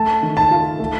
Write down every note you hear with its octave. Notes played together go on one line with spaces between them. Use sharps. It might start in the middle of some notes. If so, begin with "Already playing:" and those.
Already playing: A3 A5
D#3
A5
F4
A3